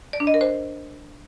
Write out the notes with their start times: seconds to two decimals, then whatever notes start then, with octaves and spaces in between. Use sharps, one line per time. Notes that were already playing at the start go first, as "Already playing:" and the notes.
0.13 D5
0.20 D4
0.27 D#5
0.34 A#4
0.41 C5